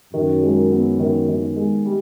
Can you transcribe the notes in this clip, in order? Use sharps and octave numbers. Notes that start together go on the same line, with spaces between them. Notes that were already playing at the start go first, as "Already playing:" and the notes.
F#2 D#3
G#3
B3
D#3
D#3
G#3
G3